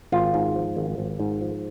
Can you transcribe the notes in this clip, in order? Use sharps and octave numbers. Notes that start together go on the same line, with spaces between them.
G#1 F4
G#2
F3
G#1
G#1
G#2
F3